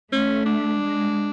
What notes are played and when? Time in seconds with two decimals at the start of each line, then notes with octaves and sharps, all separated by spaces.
0.12 A3 C#4
0.46 D4
0.80 G#3